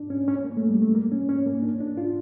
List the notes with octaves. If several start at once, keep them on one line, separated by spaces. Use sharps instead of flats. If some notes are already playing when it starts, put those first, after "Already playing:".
Already playing: D4
C#4
C#4
A#3
A3
G3
A3
A#3
C#4
C#4
A#3
D4
D4
F4